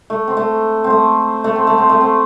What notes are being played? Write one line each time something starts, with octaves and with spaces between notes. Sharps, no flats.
A3
C4
A3
C4
A3
A3
C4
A3
C4
A3
C4